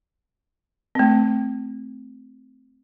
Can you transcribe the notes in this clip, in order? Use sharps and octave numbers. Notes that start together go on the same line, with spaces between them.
A3 C4